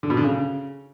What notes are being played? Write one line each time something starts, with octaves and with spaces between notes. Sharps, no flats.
D3
B2
D3
C#3